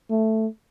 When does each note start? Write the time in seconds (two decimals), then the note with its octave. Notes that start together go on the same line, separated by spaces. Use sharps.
0.11 A3